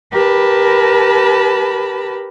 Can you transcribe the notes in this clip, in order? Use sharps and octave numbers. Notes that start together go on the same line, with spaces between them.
G4 A#4 B4 A5 B5